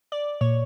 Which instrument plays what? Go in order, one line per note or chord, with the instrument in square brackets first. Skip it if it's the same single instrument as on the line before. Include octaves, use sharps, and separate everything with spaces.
[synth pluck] D5
A#2 C#5